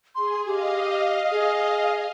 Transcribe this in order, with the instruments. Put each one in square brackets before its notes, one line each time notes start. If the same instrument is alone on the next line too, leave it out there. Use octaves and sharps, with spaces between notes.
[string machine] G#4 [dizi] C6
[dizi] G4 [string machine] D#5 F5
[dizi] G#4